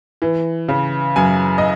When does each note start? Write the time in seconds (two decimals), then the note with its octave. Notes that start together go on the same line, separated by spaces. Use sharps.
0.22 E3
0.69 C#3
1.16 F#2 G#5
1.58 D#5